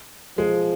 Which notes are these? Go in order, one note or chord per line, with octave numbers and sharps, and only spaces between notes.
F3 G#3